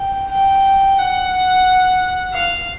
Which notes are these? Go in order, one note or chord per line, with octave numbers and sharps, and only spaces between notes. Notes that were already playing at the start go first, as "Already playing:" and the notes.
Already playing: G5
G5
F#5
F5